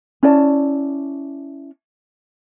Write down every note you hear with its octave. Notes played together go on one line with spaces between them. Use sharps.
C#4 E4 D5 A5